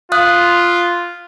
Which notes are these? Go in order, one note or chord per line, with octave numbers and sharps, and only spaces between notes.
F4 F5 D#6 F#6